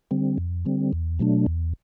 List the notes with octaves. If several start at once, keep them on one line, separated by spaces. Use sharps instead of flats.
D3 G3 C4
F2
D3 G3 C4
E2
B2 F#3 A3 D4
E2